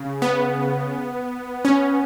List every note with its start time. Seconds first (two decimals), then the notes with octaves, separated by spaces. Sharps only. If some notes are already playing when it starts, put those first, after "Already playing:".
Already playing: C#3
0.22 B3
1.65 C#4